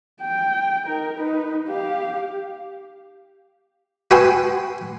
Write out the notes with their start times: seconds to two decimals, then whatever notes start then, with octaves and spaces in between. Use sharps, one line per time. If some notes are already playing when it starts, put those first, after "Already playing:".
0.21 G5
0.85 D#4 A#4
1.17 D#4 B4
1.68 G4 F5
4.11 F#4 B4 G5 G#5 C6 D#6